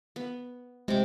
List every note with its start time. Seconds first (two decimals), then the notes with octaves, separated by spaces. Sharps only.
0.16 B3
0.88 C3 G#3 D6